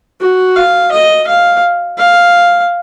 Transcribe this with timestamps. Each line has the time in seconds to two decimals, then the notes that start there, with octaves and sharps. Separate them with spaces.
0.20 F#4
0.56 F5
0.92 D#5
1.27 F5
1.98 F5